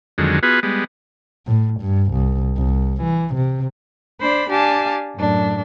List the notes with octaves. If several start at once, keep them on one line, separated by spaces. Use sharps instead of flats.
F2 D3 D#3 F#3 G#3
B3 F4 F#4 G#4 B4
G3 G#3 B3
A2
G2
C2
C2
E3
C3
D4 C5 B5
D4 G4 F5 G#5 A5
F#2 A2 D4